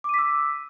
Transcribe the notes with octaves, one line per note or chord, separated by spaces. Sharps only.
D6 E6 B6 D#7